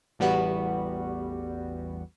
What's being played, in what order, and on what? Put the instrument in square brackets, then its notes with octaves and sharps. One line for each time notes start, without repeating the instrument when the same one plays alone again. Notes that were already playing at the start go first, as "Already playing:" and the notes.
[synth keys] A1 E2 G3 B3 F#4